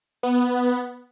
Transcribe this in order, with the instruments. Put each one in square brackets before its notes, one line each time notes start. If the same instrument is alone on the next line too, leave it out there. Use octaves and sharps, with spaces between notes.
[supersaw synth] B3